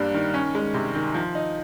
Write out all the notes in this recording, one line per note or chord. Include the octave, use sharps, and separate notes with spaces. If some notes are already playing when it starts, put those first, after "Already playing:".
Already playing: G2 G3 A#3
D#3
C#4
G#3
C3
D#3
F3
D#4